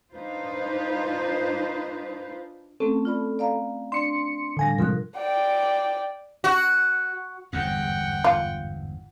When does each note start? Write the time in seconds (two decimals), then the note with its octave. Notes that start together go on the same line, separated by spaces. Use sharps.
0.17 D4 D#4 F4 B4 C5
2.80 A3 C4 C#4 A4
3.05 F4 D5 B5
3.39 D5 F5 A#5
3.92 D4 D5 C6 C#7
4.57 A2 D3 F3 G3 G#5 A#6
4.78 C3 F3 G#3 A#4 F#6
5.17 D5 G5
6.44 F#4
7.53 G1 E2 G#2 F#5 G5
8.24 F4